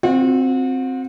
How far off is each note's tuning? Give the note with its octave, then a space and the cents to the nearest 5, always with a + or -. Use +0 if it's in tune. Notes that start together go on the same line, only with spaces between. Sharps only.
C4 +0 F#4 -35